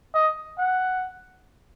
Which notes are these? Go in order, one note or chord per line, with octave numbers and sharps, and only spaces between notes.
D#5
F#5